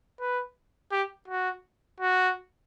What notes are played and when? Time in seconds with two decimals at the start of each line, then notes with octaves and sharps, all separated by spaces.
0.20 B4
0.92 G4
1.28 F#4
2.00 F#4